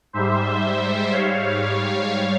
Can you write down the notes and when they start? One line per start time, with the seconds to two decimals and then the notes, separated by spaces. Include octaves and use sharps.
0.13 G#2 G3 C5 E5
1.11 G#2 G3 C#5 F5